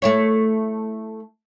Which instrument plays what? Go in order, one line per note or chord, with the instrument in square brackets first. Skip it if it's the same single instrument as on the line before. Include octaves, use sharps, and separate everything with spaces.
[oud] A3 E4 C#5